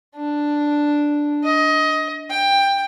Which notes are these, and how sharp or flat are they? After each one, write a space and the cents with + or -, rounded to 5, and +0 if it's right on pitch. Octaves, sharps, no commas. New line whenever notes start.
D4 +0
D#5 +20
G5 +15